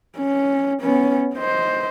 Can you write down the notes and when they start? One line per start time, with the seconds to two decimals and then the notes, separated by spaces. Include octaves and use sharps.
0.17 C#4
0.82 B3 C#4
1.35 C5 D#5